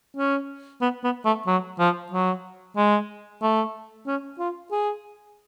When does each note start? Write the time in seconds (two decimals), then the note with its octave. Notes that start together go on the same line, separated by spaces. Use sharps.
0.16 C#4
0.81 B3
1.03 B3
1.25 A3
1.47 F#3
1.79 F3
2.12 F#3
2.77 G#3
3.42 A3
4.06 C#4
4.39 F4
4.71 G#4